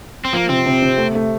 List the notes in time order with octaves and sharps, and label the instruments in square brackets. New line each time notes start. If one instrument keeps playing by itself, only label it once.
[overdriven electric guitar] C4
[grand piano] F3 [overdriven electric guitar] A#3
[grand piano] C3 [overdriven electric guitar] C4
[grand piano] C3
C3
A3
A3